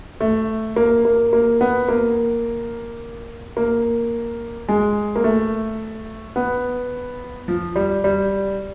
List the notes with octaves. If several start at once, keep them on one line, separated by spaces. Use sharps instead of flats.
A3
A#3
A#3
A#3
B3
A#3
A#3
G#3
A#3
A3
B3
F3
G3
G3